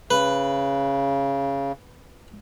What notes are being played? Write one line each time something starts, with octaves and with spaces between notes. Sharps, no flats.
C#3 B4